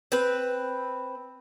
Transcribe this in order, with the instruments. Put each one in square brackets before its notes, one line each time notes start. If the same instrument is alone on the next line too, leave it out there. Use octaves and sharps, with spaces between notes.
[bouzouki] C4 B4